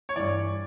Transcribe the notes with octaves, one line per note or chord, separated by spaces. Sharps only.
C#5
G2 E3 D5